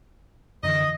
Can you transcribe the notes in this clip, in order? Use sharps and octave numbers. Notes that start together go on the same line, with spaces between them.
F#2 D3 E3 D#5